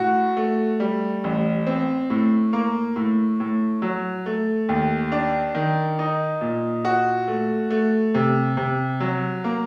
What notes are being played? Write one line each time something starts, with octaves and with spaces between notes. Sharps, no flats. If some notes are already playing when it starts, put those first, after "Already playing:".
Already playing: A2 F#4
A3
G3
A1
C4
A2
A#3
A2
A2
F#3
A3
D#2
D4
D#3
D#4
A#2
F#4
A3
A3
C3
C3
F#3
A#3